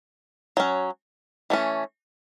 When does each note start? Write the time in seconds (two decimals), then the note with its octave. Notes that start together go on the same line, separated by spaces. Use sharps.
0.57 F#3 C#4
1.50 E3 A3 C#4